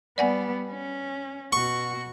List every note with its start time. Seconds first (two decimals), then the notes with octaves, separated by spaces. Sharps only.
0.18 G3 B3 D5 F#5 G#5
0.71 C#4
1.53 B2 F#4 C#6